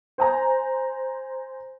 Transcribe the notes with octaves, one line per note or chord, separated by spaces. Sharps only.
C5 G#5 A#5